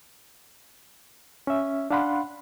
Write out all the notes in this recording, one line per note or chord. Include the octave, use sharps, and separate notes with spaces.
C#4 E5
D4 F5 F#5 B5 C6